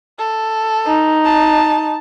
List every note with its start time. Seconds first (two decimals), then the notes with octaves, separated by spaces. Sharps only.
0.19 A4
0.86 D#4
1.25 A5